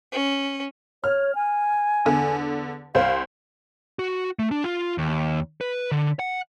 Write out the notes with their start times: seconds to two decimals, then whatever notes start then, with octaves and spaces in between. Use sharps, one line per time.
0.12 C#4
1.04 C#5 F6
1.35 G#5
2.05 E2 D3
2.95 C2 C5 F5
3.99 F#4
4.39 A3
4.51 D4
4.64 F4
4.98 D#2
5.61 B4
5.92 D3
6.19 F#5